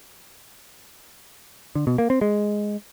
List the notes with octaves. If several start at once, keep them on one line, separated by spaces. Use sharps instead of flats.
D3
B2
A#3
C4
G#3